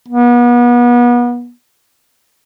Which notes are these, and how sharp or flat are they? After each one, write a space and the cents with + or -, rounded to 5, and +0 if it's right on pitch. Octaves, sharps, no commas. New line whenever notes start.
B3 -35